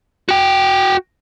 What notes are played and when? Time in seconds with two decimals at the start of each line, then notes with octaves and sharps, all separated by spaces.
0.29 F#4 G5